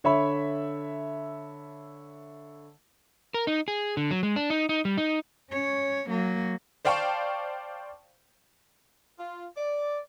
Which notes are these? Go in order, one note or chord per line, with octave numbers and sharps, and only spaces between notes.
D3 C#5 E5 B5
A#4
D#4
G#4
D3
F#3
G#3
D4
D#4
D#4
G3
D#4
C#4 C#5
F#3 A#3
C5 D5 F5 G5 A5 C#6
F4
D5